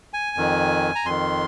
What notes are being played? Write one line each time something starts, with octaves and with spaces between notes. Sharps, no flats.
G#5
F2 D#3
A#5
F2 D#3 C6